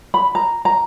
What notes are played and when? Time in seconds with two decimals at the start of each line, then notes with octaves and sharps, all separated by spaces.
0.14 B5
0.35 A#5
0.65 A#5